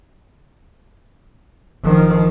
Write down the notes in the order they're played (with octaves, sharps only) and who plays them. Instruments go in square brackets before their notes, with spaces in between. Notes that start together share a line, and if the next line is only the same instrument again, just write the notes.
[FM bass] F#1 [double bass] D#3 F3